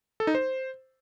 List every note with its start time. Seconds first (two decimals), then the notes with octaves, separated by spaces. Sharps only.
0.20 A4
0.27 D#4
0.35 C5